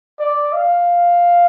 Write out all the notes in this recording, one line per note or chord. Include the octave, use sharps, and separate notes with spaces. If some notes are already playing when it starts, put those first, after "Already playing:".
D5
F5